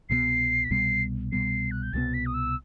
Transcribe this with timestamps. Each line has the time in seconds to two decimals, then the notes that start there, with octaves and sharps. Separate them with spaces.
0.09 C2 B2 G3 B3 C7
0.64 B6
0.70 C2 B2 G3 B3 C7
1.32 C2 B2 G3 B3 C7
1.71 F#6
1.83 G6
1.93 C2 B2 G3 B3 A6
2.14 B6
2.26 D#6
2.34 E6